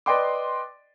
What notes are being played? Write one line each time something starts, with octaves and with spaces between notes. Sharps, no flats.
B4 D5 D#5 G5 C6 D6